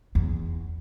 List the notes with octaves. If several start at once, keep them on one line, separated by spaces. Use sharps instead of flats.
E2